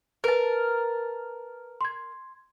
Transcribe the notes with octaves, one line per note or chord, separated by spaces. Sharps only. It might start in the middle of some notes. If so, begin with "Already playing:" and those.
A#4 B4 A5
C6 G#6